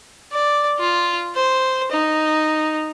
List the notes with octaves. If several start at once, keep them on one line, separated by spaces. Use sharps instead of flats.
D5
F4
C5
D#4